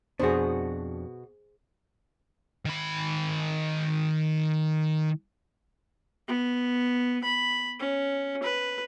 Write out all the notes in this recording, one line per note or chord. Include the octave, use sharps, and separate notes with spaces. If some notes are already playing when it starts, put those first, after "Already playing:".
F2 B2 D4 F#4 G#4 C5
D#3 B5
B3
B5
C#4
B4